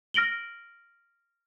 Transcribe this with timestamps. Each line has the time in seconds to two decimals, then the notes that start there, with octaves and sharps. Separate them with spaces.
0.14 F6 A#6 D7 F#7 G7